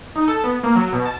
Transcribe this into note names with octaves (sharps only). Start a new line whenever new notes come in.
D#4
A4
B3
A#3
F#3
B2
A5